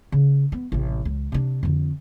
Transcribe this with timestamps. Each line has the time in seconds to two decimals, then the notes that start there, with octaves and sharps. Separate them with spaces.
0.12 C#3
0.52 B3
0.72 A1 C3
1.05 C#2
1.32 C3 D4
1.63 F2 D3